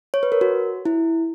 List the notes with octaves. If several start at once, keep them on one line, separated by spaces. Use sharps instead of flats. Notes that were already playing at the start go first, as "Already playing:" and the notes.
C#5
B4
A#4
F#4
E4